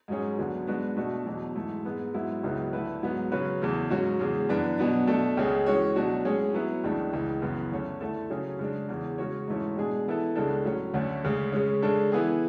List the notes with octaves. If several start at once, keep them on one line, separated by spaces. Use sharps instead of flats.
G#2 F#3 C#4 G#4
D2 D3 F#3 B3 D4
G#2 G#3 B3 D4 F#4
B2 A3 D4 F#4
E2 B2 F#3 A3
G#2 E3 A3
G#2 G#3 B3
G#2 F#3 B3 E4
C#2 C#3 F#3 B3 E4
D3 A3 E4 B4
G#2 F#3 B3
C#3 F#3 C#4 F#4 B4
E2 C#3 E3 A3
G#2 F#3 C#4 F#4
E2 C#3 G#3
F#2 E3 B3 D4
B2 F#3 B3 D4
B2 A3 D4 A4
C#2 C#3 G#3 C#4 G#4
E3 G#3 C#4 F#4 C#5
B2 F#3 A3 D4 F#4
A2 G#3 C#4 G#4 C#5
F#3 B3 E4
C#2 C#3 E3 A3 D4
C#2 C#3 E3
F#2 C#3 E3 B3
D2 D3 A3 C#4
D3 A3 E4 A4
C#3 F#3 C#4 G#4
C#3 G#3 D4
E2 C#3 E3
C#3 G#3 C#4 F#4 C#5
G#2 E3 A3 C#4
B2 G#3 D4 G#4
E3 B3 E4 A4
C#2 C#3 G#3 D4 A4
A2 F#3 C#4
D2 D3 A3 C#4
D2 C#3 G#3
C#3 G#3 C#4
C#3 G#3 D4 A4
E3 B3 E4 G#4